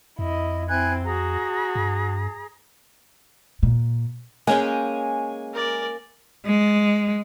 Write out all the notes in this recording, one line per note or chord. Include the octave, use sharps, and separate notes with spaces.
F2 E4 D#5
C4 E4 G#5 F#6 G#6
F#4 G#4 A#5
G2
A#2
G#3 A#3 C#4 G5 G#5
A#4 D5
G#3